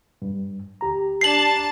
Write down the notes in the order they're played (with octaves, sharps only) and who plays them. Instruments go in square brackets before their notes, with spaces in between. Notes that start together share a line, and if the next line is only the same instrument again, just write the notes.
[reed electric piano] G2
D2 G4 A#5
[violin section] D4 A5 [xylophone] C7 F#7